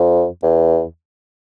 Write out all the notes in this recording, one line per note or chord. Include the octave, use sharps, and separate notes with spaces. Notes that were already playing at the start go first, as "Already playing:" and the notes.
Already playing: F2
E2